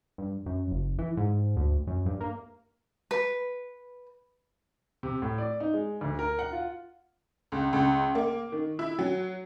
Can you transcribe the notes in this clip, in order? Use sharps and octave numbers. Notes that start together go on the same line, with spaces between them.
G2
F#2
F#1
E3
G#2
D2
F#2
G2
A#3
B4
C3
A2
D5
D#4
G#3
D2
A#4
F#5
F4
C#2
C#2
A#3
D#3
E4
F#3